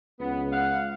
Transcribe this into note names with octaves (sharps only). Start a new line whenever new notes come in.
C#2 B3
F5 F#5